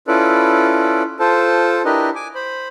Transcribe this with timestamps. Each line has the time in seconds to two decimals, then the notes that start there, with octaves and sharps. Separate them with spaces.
0.08 C#4 E4 F4 A4 B4 D5
1.20 F4 A4 C5 A5
1.85 D4 E4 G4 A#4 B4 D#5
2.15 G#5 D6
2.35 C5 B5